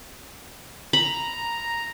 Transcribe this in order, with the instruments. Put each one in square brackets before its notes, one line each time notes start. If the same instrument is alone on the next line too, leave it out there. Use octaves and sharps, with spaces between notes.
[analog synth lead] A#5 [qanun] B5